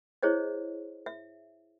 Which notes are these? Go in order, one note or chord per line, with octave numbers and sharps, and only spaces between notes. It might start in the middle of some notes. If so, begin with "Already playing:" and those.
E4 G#4 C5 C#5 D#5
E5